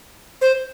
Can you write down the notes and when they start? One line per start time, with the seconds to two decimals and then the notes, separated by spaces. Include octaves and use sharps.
0.41 C5